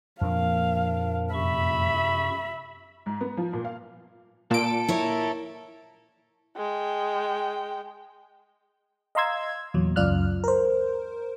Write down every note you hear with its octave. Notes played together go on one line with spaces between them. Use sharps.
F2 A#2 F3 A#3 D4 A#4 F5
F#2 C3 E5 B5 C#6
G#2
B3
F3
A#2
F5
A#2 A4 D7
E4 A#4 C#5
G#3 G5
D#5 F5 A#5 C6 E6 G#6
E2 A#2 F#3
C#2 F#2 F4 D5 F6 F#6
A#4 C5